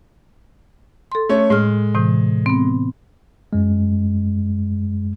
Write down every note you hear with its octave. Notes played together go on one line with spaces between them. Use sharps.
A4 C6
A3 C#4 C#5
A2 G#3 F6
A2 C3 E3
B3 C4
F#2 G#3